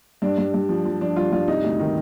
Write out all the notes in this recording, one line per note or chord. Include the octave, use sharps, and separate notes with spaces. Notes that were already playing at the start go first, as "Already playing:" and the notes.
G2 D4
G2
G2
F3
F3
F3 D4
G2 F4
G2 F4
C3 D#4
D2
D#3